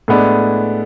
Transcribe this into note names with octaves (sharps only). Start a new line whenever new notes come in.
A2 G#3 B3 D4